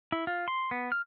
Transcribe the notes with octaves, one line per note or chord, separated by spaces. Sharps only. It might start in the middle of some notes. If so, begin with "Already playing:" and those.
E4
F4
C6
B3
F6